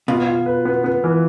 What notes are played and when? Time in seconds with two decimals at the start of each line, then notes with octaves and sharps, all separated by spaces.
0.08 B2 F4
0.27 F4
0.46 B4
0.65 B3
0.84 B3
1.04 E3